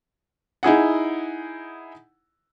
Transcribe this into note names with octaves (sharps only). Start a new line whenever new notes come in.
D#4 E4 G#4 F#5